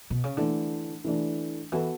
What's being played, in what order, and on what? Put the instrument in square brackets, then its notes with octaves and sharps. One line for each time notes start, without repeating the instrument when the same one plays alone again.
[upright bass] B2
C#3
[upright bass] D3 [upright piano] E3 A3 D4
[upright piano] E3 A3 D4
[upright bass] E3 [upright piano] B3 F#4 A4